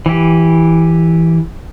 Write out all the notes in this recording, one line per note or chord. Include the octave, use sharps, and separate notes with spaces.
E3 G4